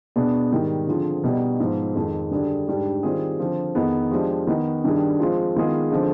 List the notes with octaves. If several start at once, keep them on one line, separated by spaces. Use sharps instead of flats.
B2 B3 D4 G#4
G#2 D#3 G3
D3 F3 C4 F4 G#4
B2 G3 B3 D#4
G#2 F3 B3
F2 D#3 G#3
G2 D3 G3 D4 G#4
G#2 G3 D4 G4
D#3 G3 C4 F4 G#4
D3 F3 C4
F2 D#3 B3 D#4 G#4
F3 G#3 D4 G4
D#3 B3 D#4
G2 D#3 G3 D4 G#4
F3 G#3 C4 F4
D#3 G#3 B3 F4 G#4
D3 F3 G#3 C4